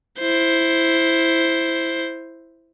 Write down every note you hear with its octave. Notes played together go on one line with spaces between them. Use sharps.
E4 C5